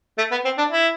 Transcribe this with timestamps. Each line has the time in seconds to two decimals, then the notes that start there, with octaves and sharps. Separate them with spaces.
0.18 A3
0.31 B3
0.45 C4
0.58 D4
0.71 E4